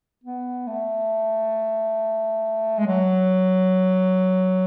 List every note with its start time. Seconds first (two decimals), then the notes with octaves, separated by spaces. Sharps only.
0.24 B3
0.67 A3
2.78 G#3
2.87 F#3